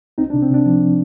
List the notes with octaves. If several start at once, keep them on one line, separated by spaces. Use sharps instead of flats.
C2 C4 D#4
D4
C3
C4
C3 D4
F3